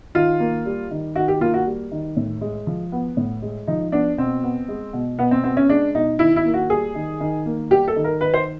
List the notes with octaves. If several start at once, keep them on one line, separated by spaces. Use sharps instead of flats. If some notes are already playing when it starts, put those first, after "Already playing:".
D#3 F4
A#3
G3
D#3
D#3 F#4
G4
A#3 F4
F#4
G3
D#3
A2
G#3
F3
B3
A2
G#3
F3 D#4
B3 D4
B2 C4
B3
G#3
B2
B2 B3
C4
B3 C4
C#4
G#3 D4
B2 D#4
D#3 E4
E4
A#3
F#4
G3 G#4
D#3
D#3
A#3
G3 G4
A4
D#3
A#4
D#3 B4
C5